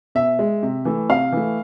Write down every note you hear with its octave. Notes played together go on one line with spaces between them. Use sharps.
B2 E5
G#3
C3
E3 A3
C3 F5
E3 A3